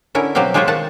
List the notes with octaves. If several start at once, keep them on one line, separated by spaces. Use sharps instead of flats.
D3 C#4 E4 A#4
B2 F#3 C4 G4 F5 G5
G#3 F4 G4 G#4 C5 C#5
D#3 D#4 F#5 A5